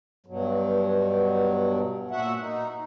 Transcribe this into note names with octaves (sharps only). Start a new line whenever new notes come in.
G2 B2 F#3
A#2 F#4 E5 F#5
D#4